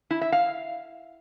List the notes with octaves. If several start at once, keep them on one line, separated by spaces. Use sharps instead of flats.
E4
E5
F5